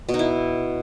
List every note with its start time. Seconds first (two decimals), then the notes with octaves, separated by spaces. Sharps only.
0.09 B2
0.14 D#4
0.19 E4